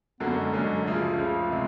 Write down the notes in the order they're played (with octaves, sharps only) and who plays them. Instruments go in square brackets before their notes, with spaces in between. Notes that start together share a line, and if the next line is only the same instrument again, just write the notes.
[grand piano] F#2 D3 F#3 A#3 C#4 [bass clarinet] B3
[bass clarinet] G#3
[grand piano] F#2 D3 F#3 A#3 C#4 [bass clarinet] G#3
[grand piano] C#2 C#3 F3 [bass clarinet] A3
[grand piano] C#2 C#3 F3
C3 F3 G#3